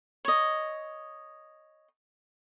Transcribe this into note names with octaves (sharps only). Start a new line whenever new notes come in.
C#5 D#5